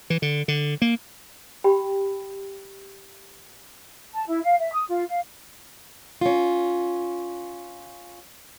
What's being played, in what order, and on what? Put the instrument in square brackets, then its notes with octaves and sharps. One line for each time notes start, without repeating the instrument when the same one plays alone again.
[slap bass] E3
D3
D3
A#3
[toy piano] G4 G5 B5
[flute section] A5
E4
F5
E5
D#6
F4
F5
[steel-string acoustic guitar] C#4 F4